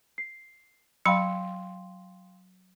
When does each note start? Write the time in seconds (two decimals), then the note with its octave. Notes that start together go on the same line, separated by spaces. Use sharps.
0.18 C7
1.05 F#3 F5 G5 B5 C6